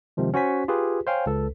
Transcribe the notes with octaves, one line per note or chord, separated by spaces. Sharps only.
C3 D#3 F3 G#3
C#4 F#4 C5 G#5 B6
F4 G4 G#4 B4
C5 C#5 F5 G5 G#5
C#2 A4 B4